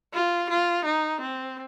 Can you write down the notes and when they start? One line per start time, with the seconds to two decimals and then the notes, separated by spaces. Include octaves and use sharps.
0.14 F4
0.50 F4
0.85 D#4
1.21 C4